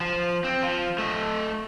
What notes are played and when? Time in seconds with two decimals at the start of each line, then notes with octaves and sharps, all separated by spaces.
0.01 F3
0.44 C4
0.63 F3
0.98 A3 D#5